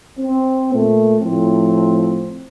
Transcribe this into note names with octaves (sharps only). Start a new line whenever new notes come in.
C4
A#2 A3
A2 F3 C4